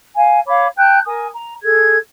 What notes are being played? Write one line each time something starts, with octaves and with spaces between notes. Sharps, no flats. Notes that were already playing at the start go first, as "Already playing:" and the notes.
F5 G#5
C#5 F5 B5 D6
G5 A5 F#6 G6
A#4 G#5 D#6
A#5
G#4 A4 G#6